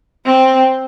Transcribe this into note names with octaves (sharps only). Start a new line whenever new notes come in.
C4